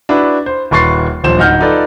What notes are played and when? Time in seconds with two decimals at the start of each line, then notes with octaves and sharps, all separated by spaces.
0.09 D4 E4 F#4 B4
0.46 C5
0.71 D#1 B4 C6 C#6 A6 C7
1.24 D#1 A#1 C5 E7
1.38 D1 D#4 F#5 F6 G6
1.61 D#4 F4 A4 B4 D5